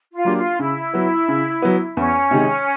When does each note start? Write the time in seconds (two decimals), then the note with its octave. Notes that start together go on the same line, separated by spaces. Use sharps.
0.14 F4
0.25 F#3 A#3 D4 G4
0.37 F4
0.59 C#3 E4
0.94 F#3 B3
1.28 C#3
1.62 F#3 B3
1.97 E2 C#4
2.31 C3 D#3 G#3